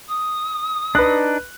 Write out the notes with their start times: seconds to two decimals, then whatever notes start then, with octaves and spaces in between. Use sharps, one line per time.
0.08 D#6
0.95 D4 D#4 B4 F#6